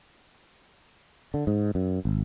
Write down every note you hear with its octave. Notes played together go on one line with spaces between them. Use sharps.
D3
G#2
F#2
G#1